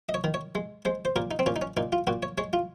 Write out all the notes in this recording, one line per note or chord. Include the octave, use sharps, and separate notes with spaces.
D#5
C#5
D#3
C#5
G#3
G#3 C5
C5
A#2 A#4
D#4
C4
A#2 C#4
D#4
C#4
A#2 D#4
F4
A#2 F#4
C#5
G#3 C#5
F4